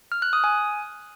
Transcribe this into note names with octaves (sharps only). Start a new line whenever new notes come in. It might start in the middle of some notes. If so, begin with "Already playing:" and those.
F6
F#6
D#6
G#5